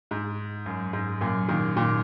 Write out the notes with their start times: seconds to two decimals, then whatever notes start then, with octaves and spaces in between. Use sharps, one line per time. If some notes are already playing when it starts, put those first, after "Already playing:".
0.11 G#2
0.66 F#2
0.93 G#2
1.21 F#2 A#2
1.48 A#2 D#3
1.76 A#2 D#3